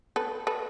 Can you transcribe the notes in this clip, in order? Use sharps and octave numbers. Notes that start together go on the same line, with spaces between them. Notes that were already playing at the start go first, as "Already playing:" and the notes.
A4 B4
A4 B4